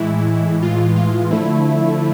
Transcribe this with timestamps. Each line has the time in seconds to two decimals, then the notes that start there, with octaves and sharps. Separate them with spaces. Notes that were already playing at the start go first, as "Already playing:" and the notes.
Already playing: A2 E3 G#3 E4
0.63 F4
0.96 F4
1.31 D3 F3 A3 E4